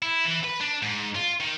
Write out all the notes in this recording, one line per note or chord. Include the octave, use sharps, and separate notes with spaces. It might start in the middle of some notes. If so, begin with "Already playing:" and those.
E4
E3
B4
D4
G#2
F4
D#3